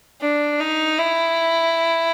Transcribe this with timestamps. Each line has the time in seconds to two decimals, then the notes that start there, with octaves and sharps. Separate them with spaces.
0.21 D4
0.60 D#4
0.98 E4